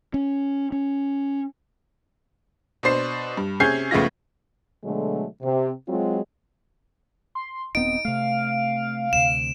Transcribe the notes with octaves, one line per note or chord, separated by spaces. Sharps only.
C#4
C#4
B2 D4 C5 C7
G2
C3 C#4 G#4 G6 G#6 C7
A#1 C#3 A3 B3 F4 A#6
B2 D3 F#3 G#3 A3
C3
F#3 G#3 C4 F4 F#4
C6
D#1 B3 C4 D#4 D7
C3 A3 F5
D2 C3 E7